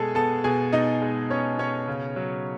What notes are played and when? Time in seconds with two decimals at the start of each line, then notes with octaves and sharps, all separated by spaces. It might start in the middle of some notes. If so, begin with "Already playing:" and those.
Already playing: B2 G#3 G#4 A4 G#5 A5
0.15 B3 A4 A5
0.44 B2 G#4 G#5
0.73 B2 D#4 D#5
1.02 G#3
1.30 B3 C#4 C#5
1.58 B2 C#4 C#5
1.87 C#3
2.16 F#3